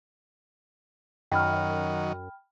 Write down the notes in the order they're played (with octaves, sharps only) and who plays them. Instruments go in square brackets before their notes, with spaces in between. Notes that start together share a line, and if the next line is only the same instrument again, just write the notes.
[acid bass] F#2 [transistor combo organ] D#3 F#3 [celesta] G5 B5 F6